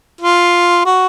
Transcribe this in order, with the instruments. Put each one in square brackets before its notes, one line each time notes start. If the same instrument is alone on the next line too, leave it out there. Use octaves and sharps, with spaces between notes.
[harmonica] F4
F#4